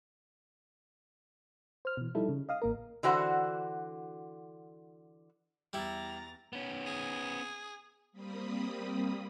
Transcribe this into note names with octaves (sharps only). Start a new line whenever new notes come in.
C5 F6
B2 E3
F3 G3 D#4 E4 A4
C#3
D#5 F5 D#6
A1 A#3 A#4
D3 E3 F#4 C5 F#5
E2 G3 E4 A#5 A6
B3 C#4
G#4
G3 A#3 C4 B5 D#6